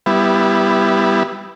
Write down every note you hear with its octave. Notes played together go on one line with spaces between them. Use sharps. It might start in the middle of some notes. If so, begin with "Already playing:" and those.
G3 B3 E4